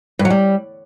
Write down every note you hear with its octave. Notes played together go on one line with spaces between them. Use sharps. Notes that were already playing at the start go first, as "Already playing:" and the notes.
G2
F#3
G3